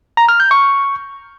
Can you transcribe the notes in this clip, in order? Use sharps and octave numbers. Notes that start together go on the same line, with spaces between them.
A#5
F6
G6
C#6